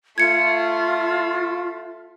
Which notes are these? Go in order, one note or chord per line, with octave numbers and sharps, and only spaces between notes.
A3 F4 G#6 C#7